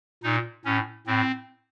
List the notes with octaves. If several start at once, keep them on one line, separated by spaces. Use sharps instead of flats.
A#2 D#4
A2 C#4
A2 C4